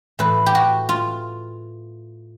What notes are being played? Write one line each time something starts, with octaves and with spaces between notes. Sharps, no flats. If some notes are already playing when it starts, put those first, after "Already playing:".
A2 E3 B4
G4
F#4
F4